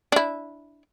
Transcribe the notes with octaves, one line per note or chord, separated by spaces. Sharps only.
D4 E4